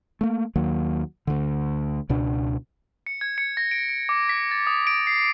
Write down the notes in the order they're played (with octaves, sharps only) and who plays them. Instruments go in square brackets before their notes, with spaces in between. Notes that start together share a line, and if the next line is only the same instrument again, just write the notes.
[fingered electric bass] A3 A#3
D#2 D#3 F#3 A#3
D2 D3
C#2 B2 D4
[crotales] C#7
G#6
C#7
A#6
D7
D7
D6
B6
A6
D#6
D7
C7